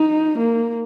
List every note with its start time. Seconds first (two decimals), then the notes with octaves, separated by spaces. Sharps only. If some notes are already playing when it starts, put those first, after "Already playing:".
Already playing: D#4
0.39 A#3